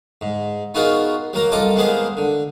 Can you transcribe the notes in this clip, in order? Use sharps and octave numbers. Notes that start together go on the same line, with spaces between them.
G#2
B3 D#4 F4 F#4 G#4 A#4
F#3 A#3 A#4 A#5
C2 F4 A4 D#5 A#5 D6
G#3 A#3 B3 G#4 C5 F5
D3